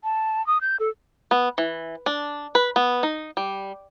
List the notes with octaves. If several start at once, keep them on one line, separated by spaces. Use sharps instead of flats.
A5
D#6
G6
A4
B3
E3
D4
B4
B3
D#4
G3